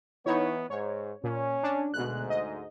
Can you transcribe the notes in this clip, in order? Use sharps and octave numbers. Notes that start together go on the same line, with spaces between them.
E3 B3 D#4 E4 C#5
G#2 C#5
A#2 C#4
D4
D2 G#2 B2 F#6
D#5